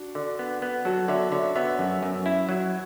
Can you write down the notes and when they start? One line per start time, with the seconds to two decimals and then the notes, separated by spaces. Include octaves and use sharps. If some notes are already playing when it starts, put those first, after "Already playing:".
Already playing: D4 F#4
0.15 D3
0.39 B3
0.62 B3
0.85 F#3 F#4 A4
1.08 D3 C#5 E5
1.32 D3 C#5 E5
1.55 B3 C#5 E5
1.79 F#2
2.03 F#2
2.26 E4
2.49 F#3